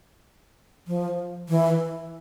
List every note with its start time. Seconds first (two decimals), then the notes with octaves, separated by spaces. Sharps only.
0.88 F3
1.49 E3